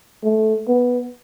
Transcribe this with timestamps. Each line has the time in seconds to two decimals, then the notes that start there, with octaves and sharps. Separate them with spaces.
0.24 A3
0.68 B3